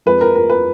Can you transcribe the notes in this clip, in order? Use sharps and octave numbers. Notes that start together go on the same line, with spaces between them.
F2 F3 G#3 B4
A#4
A#4
B4